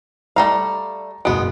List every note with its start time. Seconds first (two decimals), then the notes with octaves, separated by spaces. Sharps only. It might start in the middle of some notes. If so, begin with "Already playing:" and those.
0.36 G3 A3 F5 A5 A#5
1.25 F#1 B2 G#3 B3 D7